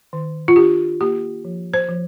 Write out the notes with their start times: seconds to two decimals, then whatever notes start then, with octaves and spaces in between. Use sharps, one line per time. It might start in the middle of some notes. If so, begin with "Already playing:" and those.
0.13 D#3
0.48 F4
0.56 D4 G4
1.01 A#3 G4
1.45 F3
1.74 C5
1.89 F3